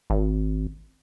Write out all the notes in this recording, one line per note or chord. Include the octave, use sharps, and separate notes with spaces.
G#1